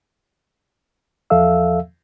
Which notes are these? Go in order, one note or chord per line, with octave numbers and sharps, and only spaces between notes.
E2 F3 A4 E5 F5 E6